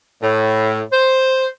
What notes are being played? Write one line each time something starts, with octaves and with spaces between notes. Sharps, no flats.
A2
C5